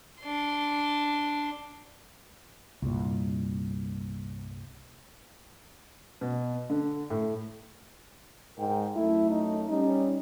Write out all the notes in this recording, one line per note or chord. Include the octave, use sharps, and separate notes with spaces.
D4 C6
C2 G2 A#2
B2
D3
A2
G#2 A#4 G5
F#2 A3 E4
D#4
G3 C#4 D#4